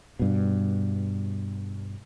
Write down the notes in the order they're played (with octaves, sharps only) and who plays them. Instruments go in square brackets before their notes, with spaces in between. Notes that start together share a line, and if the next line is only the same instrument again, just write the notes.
[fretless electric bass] G2 B2